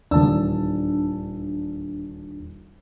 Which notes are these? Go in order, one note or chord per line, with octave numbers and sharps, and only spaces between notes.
D#1 E2 D4 A5 E6